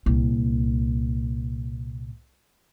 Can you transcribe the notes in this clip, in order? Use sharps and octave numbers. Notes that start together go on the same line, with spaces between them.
C2 A#2